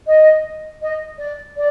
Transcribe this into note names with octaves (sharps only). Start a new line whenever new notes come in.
D#5
D#5
D5
D5